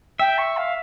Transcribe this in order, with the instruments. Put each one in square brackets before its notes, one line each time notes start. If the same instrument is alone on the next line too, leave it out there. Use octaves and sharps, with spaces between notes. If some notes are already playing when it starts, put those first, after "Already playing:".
[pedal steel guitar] E5 [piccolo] G5
[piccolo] C#6
F5